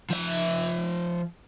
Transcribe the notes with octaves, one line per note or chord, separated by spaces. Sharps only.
F3 E5